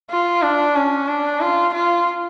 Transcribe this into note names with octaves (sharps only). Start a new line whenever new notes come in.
F4
D4
C#4
D4
F4
F4